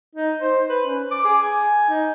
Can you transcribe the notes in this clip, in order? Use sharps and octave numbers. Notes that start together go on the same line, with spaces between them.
D#4
C5
B4
C#4
D6
G#4
G#5
D#4